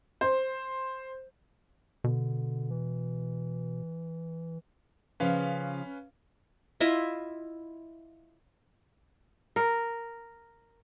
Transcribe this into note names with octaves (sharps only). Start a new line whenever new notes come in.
C5
B2 D3
E3
C#3 F3 C#4 B4 F5
E4 F4 D#5 E5
A#4